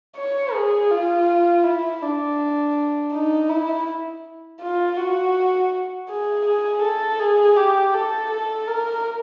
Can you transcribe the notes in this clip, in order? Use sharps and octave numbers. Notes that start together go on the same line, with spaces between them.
C#5
G#4
F4
E4
D4
D#4
E4
F4
F#4
G#4
G#4
A4
G#4
G4
A4
A4
A#4